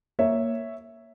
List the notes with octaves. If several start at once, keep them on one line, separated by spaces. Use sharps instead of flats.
A#3 C#5 E5